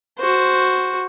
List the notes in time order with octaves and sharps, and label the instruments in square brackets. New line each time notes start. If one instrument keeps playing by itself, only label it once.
[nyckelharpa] F#4 C5